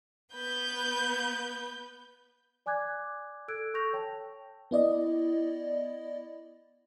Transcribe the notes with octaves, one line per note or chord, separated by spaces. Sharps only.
B3 B4 G6
D5 G#5 D6 F#6 G#6
A4 E6 F#6 G#6 D7
A4 C#6 E6 G6 A#6 F7
C#5 G5 A5
B3 E4 D5 D#5